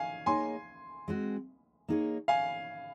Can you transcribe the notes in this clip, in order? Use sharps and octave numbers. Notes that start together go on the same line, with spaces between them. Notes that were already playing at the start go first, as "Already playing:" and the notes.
Already playing: F5 G#5
A#3 D#4 G#4 C#5 G#5 C6
G#3 C4 F#4
A#3 D#4 G#4 C#5
F5 G#5